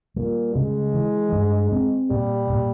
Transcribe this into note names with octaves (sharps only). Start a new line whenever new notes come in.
A#2 G3
C#3 G#3
E3
G2
C4
A#2 G3
A#2